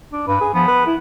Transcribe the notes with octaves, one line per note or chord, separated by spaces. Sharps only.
D4
G2 B4
G#4
F3 B3
B4
E4